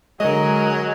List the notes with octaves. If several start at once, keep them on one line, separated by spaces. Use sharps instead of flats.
D3 F#3 G#3 G#4 A#4 D#5